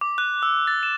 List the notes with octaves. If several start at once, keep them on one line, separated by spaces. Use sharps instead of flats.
D6
F#6
E6
A6
E7